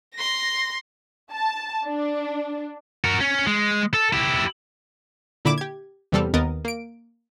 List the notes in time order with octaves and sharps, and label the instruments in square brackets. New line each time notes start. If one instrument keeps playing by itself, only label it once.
[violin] C6 A#6
[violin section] A5
D4
[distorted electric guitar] F#4 A#4
C#4
G#3
A4
E4 G4
[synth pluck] A#2 D3 E4 B5 D6 E7
G4 G#6
E2 C3 G3 C4 A4 F6
D#2 B3 A#4 D#5 D#6 A6
A#3 D7